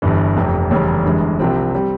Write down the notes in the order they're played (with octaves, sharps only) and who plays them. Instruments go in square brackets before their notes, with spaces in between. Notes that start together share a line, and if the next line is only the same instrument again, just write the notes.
[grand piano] G1 G2 E3
F1 F2 C3
F1 E2 C#3 G3 C#4
G1 G2 E3 G#3
C2 C3 F3 C4
G3 C4